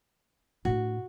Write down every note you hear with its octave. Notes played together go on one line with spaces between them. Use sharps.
A2 D4 F#4